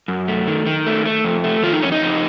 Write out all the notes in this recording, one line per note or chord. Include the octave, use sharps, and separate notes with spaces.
F#2
A3
D#3
D#3
A3
A3
F2
A3
D#3 F4
D#4
F2 C#4
D#4
F2